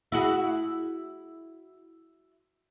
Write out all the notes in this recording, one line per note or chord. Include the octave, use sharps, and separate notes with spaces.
E4 F#4 G#4